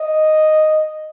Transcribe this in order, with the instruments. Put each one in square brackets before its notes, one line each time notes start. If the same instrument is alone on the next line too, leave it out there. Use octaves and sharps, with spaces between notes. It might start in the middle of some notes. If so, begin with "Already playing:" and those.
Already playing: [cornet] D#5